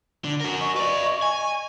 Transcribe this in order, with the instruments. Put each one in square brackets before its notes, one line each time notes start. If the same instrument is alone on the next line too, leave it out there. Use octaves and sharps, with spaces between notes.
[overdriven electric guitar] D3
F#4 A#4
[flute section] D#5 C#6
[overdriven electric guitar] B4 D5
G#5